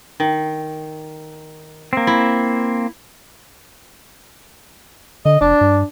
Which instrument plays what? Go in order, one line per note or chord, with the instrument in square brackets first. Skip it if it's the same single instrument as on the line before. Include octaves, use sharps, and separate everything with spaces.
[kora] D#3
[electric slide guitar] A#3 C4
[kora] E4
[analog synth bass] D3 [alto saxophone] D#5
[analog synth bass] F1 [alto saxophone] D4
[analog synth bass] G2